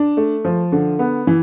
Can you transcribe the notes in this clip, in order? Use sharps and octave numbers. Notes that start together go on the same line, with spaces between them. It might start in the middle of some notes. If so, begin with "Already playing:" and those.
Already playing: D4
A3
F3
D3
B3
E3